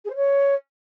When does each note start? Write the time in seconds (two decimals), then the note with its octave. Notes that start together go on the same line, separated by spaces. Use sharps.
0.05 G#4
0.10 C5
0.15 C#5